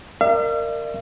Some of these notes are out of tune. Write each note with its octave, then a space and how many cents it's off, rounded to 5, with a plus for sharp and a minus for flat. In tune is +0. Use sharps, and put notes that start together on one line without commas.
A#4 -10 D5 +40 F5 -45